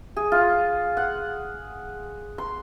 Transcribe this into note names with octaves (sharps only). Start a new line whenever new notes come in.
G#4
F4
F#5
C6